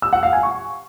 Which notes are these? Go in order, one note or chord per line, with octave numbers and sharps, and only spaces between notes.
E6
F#5
F5
G#5
C#6